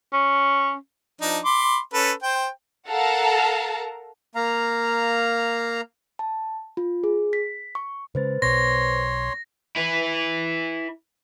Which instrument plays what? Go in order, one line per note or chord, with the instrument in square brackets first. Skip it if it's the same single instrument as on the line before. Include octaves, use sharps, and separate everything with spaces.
[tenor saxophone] C#4
[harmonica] F3 D4 D#4
B5 C6 D6
C#4 A4 B4
C5 G5
[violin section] A4 A#4 F5 F#5 A5 A#5
[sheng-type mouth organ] A#3 F5 A#5
[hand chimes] A5
F4
G#4
B6
C#6
[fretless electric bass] C#3 G#3 [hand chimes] B4 C5 A6
[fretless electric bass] B1 B2 [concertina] C#5 C6 [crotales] A#6
[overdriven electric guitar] E4 B4